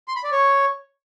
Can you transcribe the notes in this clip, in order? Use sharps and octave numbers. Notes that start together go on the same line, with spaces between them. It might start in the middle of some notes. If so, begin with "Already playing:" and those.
C6
B5
D5
C#5